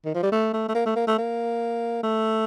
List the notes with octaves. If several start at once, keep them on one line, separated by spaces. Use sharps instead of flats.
D#3
F3
G3
A3
A3
A3
A#3
A3
A#3
A3
A#3
A3